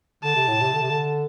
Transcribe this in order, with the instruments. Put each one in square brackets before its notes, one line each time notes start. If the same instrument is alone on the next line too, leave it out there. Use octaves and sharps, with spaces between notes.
[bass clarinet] D3 [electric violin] A5
[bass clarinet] C3
A2
C3
D3
C3
D3